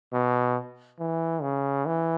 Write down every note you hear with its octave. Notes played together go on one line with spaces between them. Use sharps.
B2
E3
C#3
E3